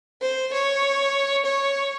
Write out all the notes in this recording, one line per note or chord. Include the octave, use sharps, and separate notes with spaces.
C5
C#5
C#5